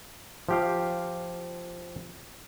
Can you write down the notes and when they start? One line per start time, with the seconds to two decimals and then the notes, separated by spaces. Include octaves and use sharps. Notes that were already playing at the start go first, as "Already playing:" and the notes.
0.49 F3 G4 F5